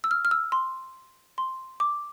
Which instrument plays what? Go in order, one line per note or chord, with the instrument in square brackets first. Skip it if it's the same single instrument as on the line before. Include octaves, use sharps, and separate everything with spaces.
[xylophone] E6
F6
F6
E6
C6
C6
D6